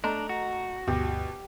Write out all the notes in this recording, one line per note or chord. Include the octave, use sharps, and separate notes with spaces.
A3 D4 D#5 A#5
F#4
D2 G2 B2 G4